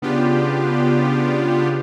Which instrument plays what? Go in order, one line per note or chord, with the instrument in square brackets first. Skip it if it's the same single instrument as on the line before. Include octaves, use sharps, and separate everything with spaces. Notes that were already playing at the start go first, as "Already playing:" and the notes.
[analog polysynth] C#3 B3 D4 F4 G4